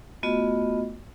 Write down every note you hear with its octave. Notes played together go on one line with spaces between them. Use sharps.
A3 B3 F4 F#4 D#5